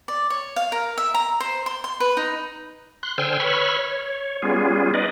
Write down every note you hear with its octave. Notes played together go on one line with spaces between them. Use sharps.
D5
C#5
F5
A#4
E5
A#5
C5
C6
C6
B4
D#4
C6 F#6
D3 C5 G5 G#5 E6 F6
B4 C#5 B5 C#6 E6 F6
C#5
G3 B3 C#4 F4 G#4
D#4 B4 D5 D#5